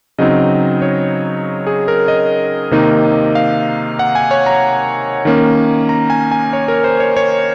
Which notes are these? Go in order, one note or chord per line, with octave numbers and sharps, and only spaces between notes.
C#3 F#3 C4 D#4 D#5
C#5
G#4
A#4
D#5
C3 D#3 A#3 D#4
F5
F#5
G#5
C#5
A#5
D#3 A#3 C#4
A#5
G#5
G#5
C#5
A#4
C5
C#5
C#5